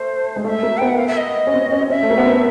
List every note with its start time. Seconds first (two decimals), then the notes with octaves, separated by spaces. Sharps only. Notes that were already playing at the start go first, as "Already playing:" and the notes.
Already playing: A3 C5
0.36 G#3
0.44 A3 F5
0.48 E5
0.63 A#3
0.77 B3 G5
0.87 F#5
0.97 F5
1.07 E5
1.17 D#5
1.47 C#4
1.54 C4
1.72 C#4
1.90 C#4 E5
2.03 A3
2.11 A#3
2.18 B3
2.26 C4